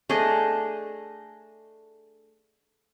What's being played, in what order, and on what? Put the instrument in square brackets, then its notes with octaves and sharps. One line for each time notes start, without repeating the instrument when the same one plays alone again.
[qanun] A3 D4 G#4 D#5